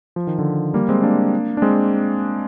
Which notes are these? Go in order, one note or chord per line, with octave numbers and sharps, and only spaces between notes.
F3
D#3
D3 F3
G3 A#3
G#3 C4
A#3 D4
D4
G#3 C4